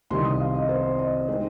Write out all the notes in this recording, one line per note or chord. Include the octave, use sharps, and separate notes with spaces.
C2 C3 D#3 C6
D#6
F5
D#5
C5
D#5
G#3 C4 D#4 C5